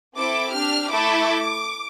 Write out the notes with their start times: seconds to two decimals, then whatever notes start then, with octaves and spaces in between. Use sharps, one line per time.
0.15 C4 E4 A4 D6
0.53 D4 G4 F6
0.90 A3 E4 A4 D6